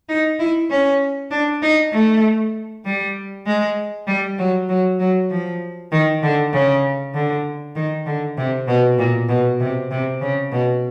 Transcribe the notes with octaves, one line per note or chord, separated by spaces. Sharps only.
D#4
E4
C#4
D4
D#4
A3
G3
G#3
G3
F#3
F#3
F#3
F3
D#3
D3
C#3
D3
D#3
D3
C3
B2
A#2
B2
C3
C3
C#3
B2